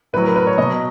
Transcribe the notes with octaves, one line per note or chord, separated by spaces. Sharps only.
A2 F#3 B4
A#4
B4
C#5
B2 F#3 D#5